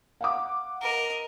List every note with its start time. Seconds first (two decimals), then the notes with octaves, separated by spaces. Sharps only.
0.21 F5 F#5 D6
0.82 A#4 D#5